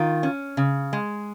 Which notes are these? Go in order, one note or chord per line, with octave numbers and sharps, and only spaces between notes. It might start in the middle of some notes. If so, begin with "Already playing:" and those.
Already playing: D#3 F4
C#4
C#3
G#3